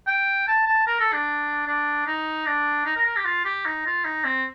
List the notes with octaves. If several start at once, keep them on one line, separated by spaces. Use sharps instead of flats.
G5
A5
A5
A#4
A4
D4
D4
D#4
D4
D#4
A#4
A#4
G4
F4
G4
D#4
F4
D#4
C4